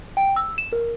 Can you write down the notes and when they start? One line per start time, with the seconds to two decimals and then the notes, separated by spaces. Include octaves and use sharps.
0.17 G5
0.36 E6
0.58 E7
0.72 A#4